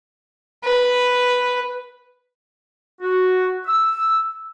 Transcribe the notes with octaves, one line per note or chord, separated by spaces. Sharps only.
B4
F#4
E6